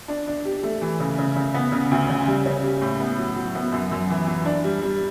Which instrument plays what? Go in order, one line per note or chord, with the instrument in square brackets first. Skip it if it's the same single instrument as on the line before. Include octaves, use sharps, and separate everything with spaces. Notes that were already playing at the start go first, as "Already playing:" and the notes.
[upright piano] D4
D4
G4
A3
E3
C#3
C#3
C#3
B3
C#3
D2
C#3
G3
C#4
G4
A2
B3
F#3
F#3
B3
F#2
F#2
E3
E3
D4
G3
G3